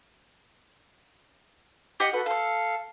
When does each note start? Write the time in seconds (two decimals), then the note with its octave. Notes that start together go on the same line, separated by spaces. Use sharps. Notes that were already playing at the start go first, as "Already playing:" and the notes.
2.00 G4 D#5 F#5
2.13 F#4 A4 B4 F#5
2.26 A4 F5 E6